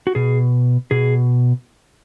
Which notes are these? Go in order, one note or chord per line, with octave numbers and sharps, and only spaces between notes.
F#4
B2 G#4
B2 G#4